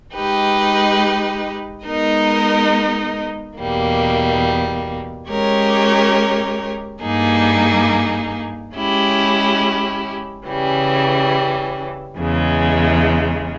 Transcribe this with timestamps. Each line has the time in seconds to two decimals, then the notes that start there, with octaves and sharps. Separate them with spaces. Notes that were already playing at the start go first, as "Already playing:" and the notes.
0.14 G#3 D#4 G4 B4
1.86 G#3 B3 D#4 A#4 D#5
3.58 E2 B2 G3 A#3
5.29 G#3 C#4 G4 A#4 C#5
7.02 G2 G3 A#3 D#4 G#4
8.74 G#3 C#4 E4 G4
10.46 C#3 E3 G3 C#4
12.18 E2 C#3 G#3